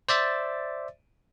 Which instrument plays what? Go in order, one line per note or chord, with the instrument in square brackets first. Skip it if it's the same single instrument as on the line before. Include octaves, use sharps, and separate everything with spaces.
[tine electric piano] C5 D5 E5 A6